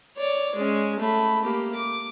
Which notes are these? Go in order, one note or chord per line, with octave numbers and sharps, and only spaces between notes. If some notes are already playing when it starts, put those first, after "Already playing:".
C#5 D5
G#3 C#4
A3 B5
A#3 G4
D6